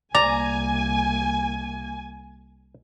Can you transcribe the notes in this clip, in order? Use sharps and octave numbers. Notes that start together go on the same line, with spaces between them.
C2 A#3 D5 G#5 A#5